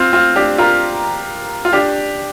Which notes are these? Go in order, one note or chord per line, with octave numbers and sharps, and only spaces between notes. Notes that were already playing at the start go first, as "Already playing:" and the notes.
Already playing: C4 F4
C4 F4
D4 G4
F4 A#4
F4
D4 G4